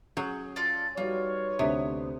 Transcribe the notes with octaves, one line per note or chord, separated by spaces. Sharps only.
F#3 C#4 G#4 G6
F4 A4 D5
G3 D#4 F4 F#4 B4 C#5
D2 C3 B3 D4 C5